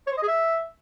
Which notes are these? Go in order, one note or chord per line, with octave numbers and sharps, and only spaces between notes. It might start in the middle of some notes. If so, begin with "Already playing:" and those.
C#5
C5
D#5
G#4
E5